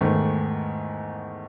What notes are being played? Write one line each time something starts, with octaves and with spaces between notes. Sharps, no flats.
E2 G#2 D#3 A3